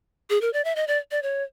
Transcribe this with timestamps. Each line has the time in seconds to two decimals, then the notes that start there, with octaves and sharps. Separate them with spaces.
0.30 G#4
0.41 A#4
0.53 D5
0.65 E5
0.76 D#5
0.88 D5
1.11 D5
1.23 C#5